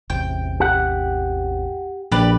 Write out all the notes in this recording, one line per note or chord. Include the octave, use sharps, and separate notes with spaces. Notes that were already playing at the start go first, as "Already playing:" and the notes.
A1 E2 C3 G5
G4 F#5
A#1 G4 B4 D5